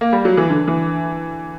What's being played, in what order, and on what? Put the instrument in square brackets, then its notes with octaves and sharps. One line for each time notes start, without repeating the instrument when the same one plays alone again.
[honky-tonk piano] A#3
G3
F#3
E3
D3
E3